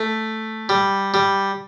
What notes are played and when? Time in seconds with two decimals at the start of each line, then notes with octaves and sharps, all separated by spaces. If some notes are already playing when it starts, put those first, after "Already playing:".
Already playing: A3
0.69 G3
1.14 G3